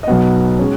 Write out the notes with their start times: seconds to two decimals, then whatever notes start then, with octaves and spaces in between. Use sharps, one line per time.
0.03 D#5
0.07 B1 B2 B3 F#5
0.59 G#3 C#4